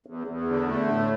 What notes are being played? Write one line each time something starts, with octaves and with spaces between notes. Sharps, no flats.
E2
E2
D3
A3
A2